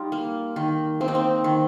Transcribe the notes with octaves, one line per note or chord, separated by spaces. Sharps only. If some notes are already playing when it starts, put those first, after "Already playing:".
Already playing: G3 D#4 F4
A#3
D#3
A#3 C4
D#4
C4
D#3